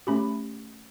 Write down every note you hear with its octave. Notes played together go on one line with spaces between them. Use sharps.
A3 C#4 G4 B5